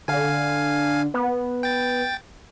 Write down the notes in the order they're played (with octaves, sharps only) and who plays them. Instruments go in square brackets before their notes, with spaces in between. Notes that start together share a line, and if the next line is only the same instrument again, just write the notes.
[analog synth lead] D3 [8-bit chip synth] F5 G#5
[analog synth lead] B3
[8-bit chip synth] G5 A6